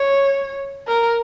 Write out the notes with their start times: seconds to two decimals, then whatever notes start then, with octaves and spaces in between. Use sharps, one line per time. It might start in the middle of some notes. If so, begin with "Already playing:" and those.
Already playing: C#5
0.87 A#4